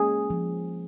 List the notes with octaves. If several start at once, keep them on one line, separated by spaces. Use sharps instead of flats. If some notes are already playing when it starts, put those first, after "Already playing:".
Already playing: G#3 A#3 C#4 G#4
F3